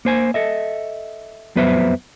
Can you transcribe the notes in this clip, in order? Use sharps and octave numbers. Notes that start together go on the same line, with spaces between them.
A#3 C5 G#5
A4 D#5 E5
F2 F#3 B3 B4 C5 E5